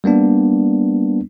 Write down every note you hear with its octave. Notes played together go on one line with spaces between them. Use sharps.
G3 A#3 B3 D4